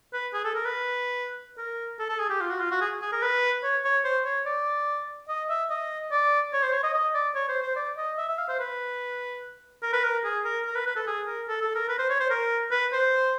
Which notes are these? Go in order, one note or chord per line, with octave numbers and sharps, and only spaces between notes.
B4
G#4
A4
A#4
B4
A#4
A4
A4
G#4
G4
F4
F#4
F4
F#4
G#4
G#4
A#4
B4
C#5
C#5
C5
C#5
D5
D#5
E5
D#5
D5
C#5
C5
C#5
D#5
D#5
D5
C#5
C5
C5
D5
D#5
E5
E5
F5
C5
B4
A#4
B4
A#4
G#4
A#4
A#4
B4
B4
A4
G#4
A#4
A4
A4
A#4
B4
C5
C#5
C5
A#4
B4
C5